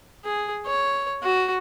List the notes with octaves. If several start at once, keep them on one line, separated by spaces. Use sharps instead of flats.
G#4
C#5
F#4